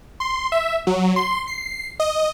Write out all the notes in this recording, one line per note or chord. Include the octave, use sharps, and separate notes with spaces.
C6
E5
F#3
C6
C7
D#5